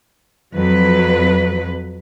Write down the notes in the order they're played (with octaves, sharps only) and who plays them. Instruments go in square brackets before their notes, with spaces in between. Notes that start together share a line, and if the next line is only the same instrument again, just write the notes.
[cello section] F2 F#3 B4